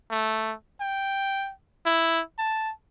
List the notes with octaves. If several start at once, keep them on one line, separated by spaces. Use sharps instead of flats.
A3
G5
E4
A5